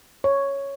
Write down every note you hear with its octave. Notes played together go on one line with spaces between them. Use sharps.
C#5